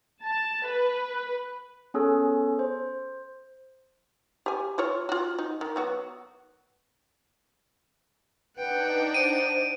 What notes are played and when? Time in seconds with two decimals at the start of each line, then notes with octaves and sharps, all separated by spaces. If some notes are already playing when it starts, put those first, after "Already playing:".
0.24 A5
0.67 B4
1.94 B3 C#4 G#4 A4 C#5
2.59 C5
4.46 G4 G#5
4.78 E4 F4 C#5
5.09 F4 F#4
5.39 D#4
5.61 D#3
5.76 F#3 B3 F#4
8.57 D4 D#4 B4 F#5 G5
9.14 C5 D7 D#7